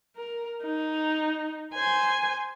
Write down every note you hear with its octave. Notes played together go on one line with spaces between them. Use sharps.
A#4
D#4
C5 G#5